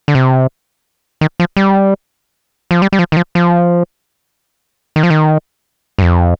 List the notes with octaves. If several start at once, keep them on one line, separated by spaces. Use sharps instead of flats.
D3
C3
D#3
F3
G3
F3
G3
G3
F3
D#3
F3
F3
D#3
F3
D#3
G2
F2